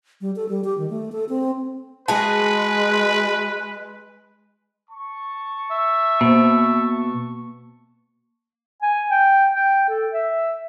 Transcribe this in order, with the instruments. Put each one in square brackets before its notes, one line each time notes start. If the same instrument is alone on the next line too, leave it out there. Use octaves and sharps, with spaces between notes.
[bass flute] G3
A4
G3
G4
D#3
A3
A4
C4
[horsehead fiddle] G#3 [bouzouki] F#4 G#4 [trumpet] B4 [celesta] A5
[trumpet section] A5 C#6
[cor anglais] E5
[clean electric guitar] B2 [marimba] A#3 C5
[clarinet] G#5
G5
G5
A4
E5